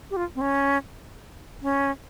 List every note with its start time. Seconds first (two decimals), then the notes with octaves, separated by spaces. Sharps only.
0.11 G4
0.17 F4
0.35 C4
0.41 C#4
1.62 C#4